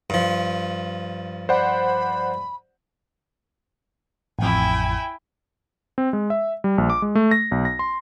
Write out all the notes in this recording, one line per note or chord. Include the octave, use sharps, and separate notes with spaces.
G2 F3
C5 D5 F#5 B5
A1 F2 E4 G5 G#5
C4
G#3
E5
G3
A#1
D6
G#3
A3
A#6
B1
A#6
C6